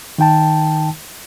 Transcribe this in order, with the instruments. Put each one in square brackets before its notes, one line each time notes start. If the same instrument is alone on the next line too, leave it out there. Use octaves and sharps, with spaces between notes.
[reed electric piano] D#3 D#4 G5 A5